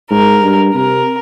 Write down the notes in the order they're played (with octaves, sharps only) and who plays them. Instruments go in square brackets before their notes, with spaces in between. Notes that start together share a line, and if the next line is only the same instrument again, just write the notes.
[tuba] G#2 [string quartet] A#4
[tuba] G2
[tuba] C3 [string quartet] A#4